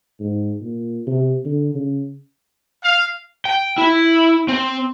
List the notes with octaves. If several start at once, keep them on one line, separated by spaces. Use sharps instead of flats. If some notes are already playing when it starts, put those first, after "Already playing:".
G#2
A#2
C3
D3
C#3
F5
G5
E4
C4